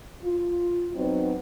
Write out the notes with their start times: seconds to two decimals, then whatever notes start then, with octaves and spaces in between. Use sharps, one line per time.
0.23 F4
0.95 F#3 B3 C4 D#4